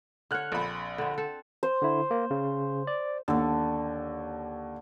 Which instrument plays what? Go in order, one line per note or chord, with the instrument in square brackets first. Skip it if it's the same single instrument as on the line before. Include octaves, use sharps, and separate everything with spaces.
[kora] D3 C#5 [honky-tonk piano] F6 F#6
[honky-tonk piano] A#1 B5 [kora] C4 A4
[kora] D3 C4
C4 A4
[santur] C5
[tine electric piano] D3 E4
A#3
C#3
D5
[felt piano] D#2 [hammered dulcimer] D3 A4